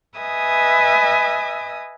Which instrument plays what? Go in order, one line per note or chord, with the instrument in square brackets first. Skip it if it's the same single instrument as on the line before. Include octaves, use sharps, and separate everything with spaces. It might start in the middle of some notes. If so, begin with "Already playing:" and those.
[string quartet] B4 D#5 E5 G#5 D#6